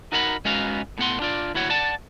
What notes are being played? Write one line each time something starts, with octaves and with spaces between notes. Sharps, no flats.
D#4 F#4 A#4 F#5 A#5 B5
G#3 B3 C#4 D#4 F#4 F5
A2 B3 F#5 C6
D4 F4 D5
D2 E4 F#4 C#5 F#5
D5 F#5 A5